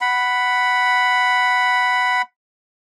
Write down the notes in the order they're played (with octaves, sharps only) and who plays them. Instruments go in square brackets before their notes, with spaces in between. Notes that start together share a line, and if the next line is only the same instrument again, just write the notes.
[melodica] F#5 B5